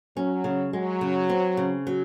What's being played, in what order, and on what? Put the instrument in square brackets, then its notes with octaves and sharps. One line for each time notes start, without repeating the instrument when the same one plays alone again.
[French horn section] F#3 [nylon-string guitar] C#4
[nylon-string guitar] C#3
[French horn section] F#3 [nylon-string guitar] G#3
[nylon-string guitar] C#3
C4
C#3
F#3